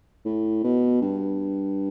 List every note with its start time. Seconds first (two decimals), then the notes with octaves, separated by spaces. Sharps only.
0.25 A2
0.64 B2
1.02 G2